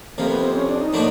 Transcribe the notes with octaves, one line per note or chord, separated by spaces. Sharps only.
F2 C3 F3 A#3
B3
C4
C#4
D4
D#4
A2 F3 A#3 D4 F#4